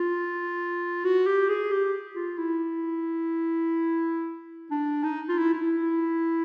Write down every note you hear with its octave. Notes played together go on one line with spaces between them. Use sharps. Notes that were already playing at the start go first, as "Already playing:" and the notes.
Already playing: F4
F#4
G4
G#4
G4
F4
E4
D4
D#4
F4
E4
E4